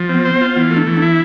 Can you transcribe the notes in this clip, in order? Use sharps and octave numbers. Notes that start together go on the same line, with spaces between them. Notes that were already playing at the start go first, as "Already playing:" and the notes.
Already playing: F3
B3 C4
C5
B3
F4
E3 B3
A3
D4
E3
D4
E4